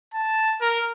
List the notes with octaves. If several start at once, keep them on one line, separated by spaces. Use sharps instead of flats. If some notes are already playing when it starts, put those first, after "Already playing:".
A5
A#4